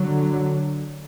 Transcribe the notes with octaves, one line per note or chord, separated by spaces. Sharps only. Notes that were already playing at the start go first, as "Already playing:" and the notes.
Already playing: D3 F#3